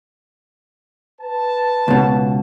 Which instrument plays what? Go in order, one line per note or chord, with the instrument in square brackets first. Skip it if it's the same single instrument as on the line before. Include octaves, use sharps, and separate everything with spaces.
[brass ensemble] B4 A5
[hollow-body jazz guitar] C#2 B2